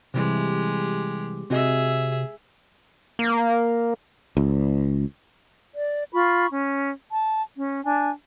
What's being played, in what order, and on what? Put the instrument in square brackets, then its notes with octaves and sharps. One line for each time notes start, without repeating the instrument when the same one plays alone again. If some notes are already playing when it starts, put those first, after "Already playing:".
[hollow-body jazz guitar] C3 E3 G3 [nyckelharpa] G#3 G4
[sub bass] C3 [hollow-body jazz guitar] C4 F#4 D#5 [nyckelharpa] G#4 E5
[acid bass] A#3
[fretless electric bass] C#2
[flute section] D5
F4 B5 C#6
C#4
A5
C#4
D4 G#5